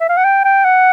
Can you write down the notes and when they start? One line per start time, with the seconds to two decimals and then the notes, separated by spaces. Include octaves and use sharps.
0.01 E5
0.09 F5
0.17 F#5
0.24 G5
0.44 G5
0.65 F#5